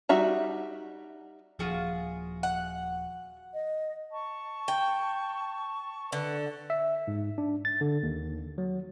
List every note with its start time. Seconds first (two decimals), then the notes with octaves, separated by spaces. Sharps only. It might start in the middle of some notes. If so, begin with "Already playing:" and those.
0.09 G3 D#4 F#4 E5 A#5
1.59 D#1 F3 F4 F#4 G#4
2.43 F#5
3.54 D#5
4.11 A5 C#6
4.68 G5
6.12 D3 B4 F#5
6.70 E5
7.07 G#2
7.38 D4
7.65 A6
7.81 D3
8.03 D#2
8.58 F#3